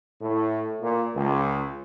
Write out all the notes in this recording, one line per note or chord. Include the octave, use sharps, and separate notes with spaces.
A2
A#2
C#2